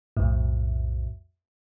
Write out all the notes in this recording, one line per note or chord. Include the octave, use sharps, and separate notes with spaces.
B1 F2 A2